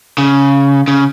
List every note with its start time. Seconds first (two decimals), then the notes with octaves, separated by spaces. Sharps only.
0.18 C#3
0.88 C#3